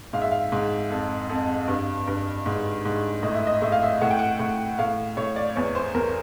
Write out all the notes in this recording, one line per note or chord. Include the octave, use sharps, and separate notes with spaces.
G#2 F5
E5
F5
G#2
F2
F2
G2
G2
G#2
G#2
A2 D#5
E5
D#5
A2 E5
F5
E5
A2 F#5
G5
F#5
A2
A2 F5
A2 C#5
D5
E2 C#5
C5
E2 A#4